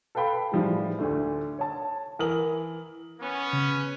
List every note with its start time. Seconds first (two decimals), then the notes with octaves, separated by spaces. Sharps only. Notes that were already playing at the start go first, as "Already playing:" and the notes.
0.15 A4 B4 F5 G5 B5
0.52 A2 E3 F3 G3 G#3
0.99 D2 D3 A3
1.59 C#5 A5
2.19 E3 A#4 D#6 F#7
3.20 B3 C#4
3.53 C#3